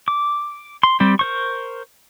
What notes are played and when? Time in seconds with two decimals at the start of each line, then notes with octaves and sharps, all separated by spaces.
0.08 D6
0.83 C6
1.00 G3 C4 G4
1.19 A#4 C5 C#6